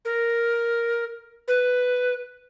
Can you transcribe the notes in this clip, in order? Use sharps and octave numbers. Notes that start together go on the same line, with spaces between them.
A#4
B4